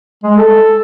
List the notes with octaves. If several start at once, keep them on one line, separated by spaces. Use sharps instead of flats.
G#3
A4